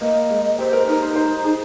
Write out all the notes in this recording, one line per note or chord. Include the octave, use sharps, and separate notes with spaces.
A#3 D#5
G#3
G4 C5
A#4
D#4 A#4
C5
C5
G#4